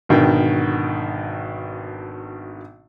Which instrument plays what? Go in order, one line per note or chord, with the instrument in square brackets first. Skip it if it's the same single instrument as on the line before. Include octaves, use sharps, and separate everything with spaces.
[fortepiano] G#1 B2 D3 D#3 G5